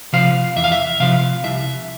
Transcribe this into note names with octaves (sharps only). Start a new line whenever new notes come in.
C3 F3 F5
E2 E5
F5
E5
C3 F3 F5
C2 E5